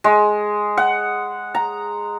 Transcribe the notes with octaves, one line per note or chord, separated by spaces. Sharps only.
G#3
F#5
A#5